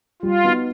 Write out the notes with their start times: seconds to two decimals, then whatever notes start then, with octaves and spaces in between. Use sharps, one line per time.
0.22 G3 F4
0.44 B3 D#4 F#4